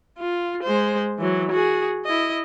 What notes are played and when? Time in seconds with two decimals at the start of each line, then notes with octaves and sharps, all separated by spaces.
0.18 F4
0.63 G#3 C5
1.19 E3 F#3
1.51 F#4 G#4
2.06 E4 D#5